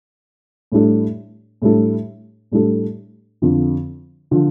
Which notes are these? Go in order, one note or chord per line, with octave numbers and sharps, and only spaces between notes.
A2 G3 D4 A4
A2 G3 D4 A4
A2 G3 D4 A4
F2 D3 F3
D3 F3